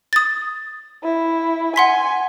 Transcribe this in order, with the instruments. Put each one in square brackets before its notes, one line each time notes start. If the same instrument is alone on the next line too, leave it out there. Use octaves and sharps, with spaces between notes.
[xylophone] D#6 A6
[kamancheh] E4
[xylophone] F#5 C6 B6 [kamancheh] G#5